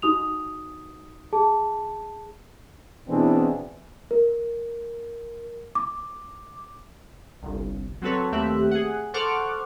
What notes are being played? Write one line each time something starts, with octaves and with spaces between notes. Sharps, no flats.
D#4 F#4 D#6 F7
G#4 A5
B2 E3 C4 D4 E4 G#4
A#4
D6
G1 C2
F#3 C4 F#4 A4 B4 C#5
D#2 A3 C4 G4 E5 F#6
G#4 F#5
A4 C5 F#5 C#6 D6 F6